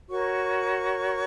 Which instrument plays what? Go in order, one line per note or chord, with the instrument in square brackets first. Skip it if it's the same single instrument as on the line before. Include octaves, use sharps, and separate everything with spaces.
[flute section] F#4 A#4 C#5 C#6